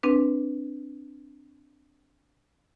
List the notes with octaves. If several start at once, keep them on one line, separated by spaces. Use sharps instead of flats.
C4 D4 B4